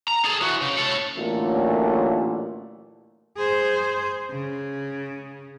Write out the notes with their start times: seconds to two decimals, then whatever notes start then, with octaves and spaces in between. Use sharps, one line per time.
0.08 A#5
0.25 G#4 A4
0.42 E3 F#4
0.62 C#3
0.77 A4 C#5
1.16 A1 A#2 D3 F#3 A3
3.37 G#4 C5
4.30 C#3